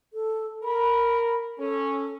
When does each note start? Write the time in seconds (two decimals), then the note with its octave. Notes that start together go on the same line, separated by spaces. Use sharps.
0.13 A4
0.64 A#4 B5
1.58 C#4 A4